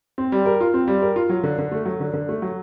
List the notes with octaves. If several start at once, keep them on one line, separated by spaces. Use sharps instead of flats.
C4
G3
A#4
F4
C4
G3
A#4
F4
F#3
D3
D3
A3
F#3
D3
D3
A3
F#3